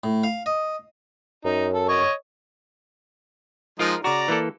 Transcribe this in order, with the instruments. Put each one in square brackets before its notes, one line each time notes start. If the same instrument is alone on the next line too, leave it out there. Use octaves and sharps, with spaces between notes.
[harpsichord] A2
F5
D#5
[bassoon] F#2 [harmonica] D#4
[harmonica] A4
C#5 D#5 C#6
[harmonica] F3 G#3 D#4 [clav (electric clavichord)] F4 A#4
[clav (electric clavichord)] C#3 F#4 [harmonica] D5 A#5
[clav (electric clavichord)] E3 A#3 A4